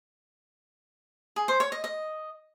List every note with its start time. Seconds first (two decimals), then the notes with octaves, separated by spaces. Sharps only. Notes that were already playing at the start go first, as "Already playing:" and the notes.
1.36 G#4
1.48 C5
1.60 C#5
1.72 D#5
1.84 D#5